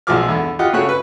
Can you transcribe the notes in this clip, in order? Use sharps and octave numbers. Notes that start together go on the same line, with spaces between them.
B1 A#2 F3 G#3 D6 F6
E2 D3
F4 G4 D#5 F#5
C#3 A3 F#4 C#5 F#6
B4